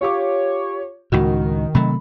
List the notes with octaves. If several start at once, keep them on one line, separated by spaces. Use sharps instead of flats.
F4 G4 C#5 D6
C#2 A2 D#3 F#4
C3 F#3 A3 B5